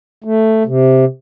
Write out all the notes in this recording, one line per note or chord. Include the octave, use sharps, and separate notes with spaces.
A3
C3